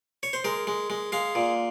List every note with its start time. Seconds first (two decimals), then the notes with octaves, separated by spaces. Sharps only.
0.23 C#5
0.33 C5
0.44 G#3 A#4
0.67 G#3
0.90 G#3
1.12 G#3 F5
1.35 A#2